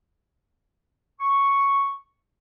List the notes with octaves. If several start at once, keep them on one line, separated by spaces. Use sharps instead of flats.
C#6